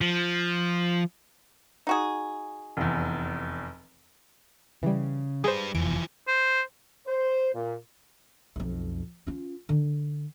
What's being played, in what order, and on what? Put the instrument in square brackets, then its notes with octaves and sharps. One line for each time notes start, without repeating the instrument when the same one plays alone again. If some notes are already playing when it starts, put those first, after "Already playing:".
[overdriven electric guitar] F3
[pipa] D#4 F#4 G#4
[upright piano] F1 E2
[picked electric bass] C#3 [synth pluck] E3 G3
[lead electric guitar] G3 B4 [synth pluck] G#4 C5
[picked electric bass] F1 E2 [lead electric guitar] E3 F3 [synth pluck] D7
[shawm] C5
[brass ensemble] C5
A#2
[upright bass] B1 F2
C#4 F4
D3